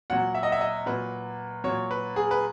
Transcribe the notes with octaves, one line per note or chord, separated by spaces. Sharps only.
A#2 F#3 F#5
E5
D#5
E5
D#5
A#2 F#3 B4
A#2 F#3 C#5
B4
G#4
B4